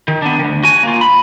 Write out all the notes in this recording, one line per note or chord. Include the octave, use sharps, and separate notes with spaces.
D#3
B3 D4
D2 D#3
F#4 G#5
A#3 F4
B5